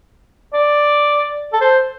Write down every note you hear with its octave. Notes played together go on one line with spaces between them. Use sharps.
D5
A4
C5